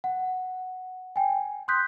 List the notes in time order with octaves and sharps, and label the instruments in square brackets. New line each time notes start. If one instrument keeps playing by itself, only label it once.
[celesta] F#5
G5 G#5
C6 D#6 F#6 G6 B6